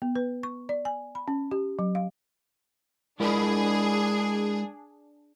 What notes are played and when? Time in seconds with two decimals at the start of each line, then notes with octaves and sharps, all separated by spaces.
0.02 B3
0.16 B4
0.43 C#6
0.69 D5
0.85 G#5
1.15 B5
1.28 C#4
1.51 G4
1.79 F#3
1.95 F5
3.20 G#3 D4 E4 G#4 A#4